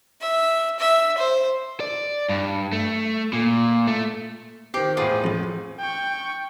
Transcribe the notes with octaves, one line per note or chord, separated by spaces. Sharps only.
E5
E5
C5
D5
G2
A3
A#2
A3
D#3 G4 C5 C7
E2 A2 F4 G#4
F2 G#2
G5 C#6